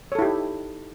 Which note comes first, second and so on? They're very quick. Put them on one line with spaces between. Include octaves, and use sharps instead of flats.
C#5 A4 E4 G4 D#4